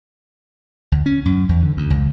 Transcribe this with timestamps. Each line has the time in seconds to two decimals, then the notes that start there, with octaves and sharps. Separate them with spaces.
0.92 D2
1.06 C#4
1.25 F#2
1.49 E2
1.63 D3
1.77 D2
1.90 C#2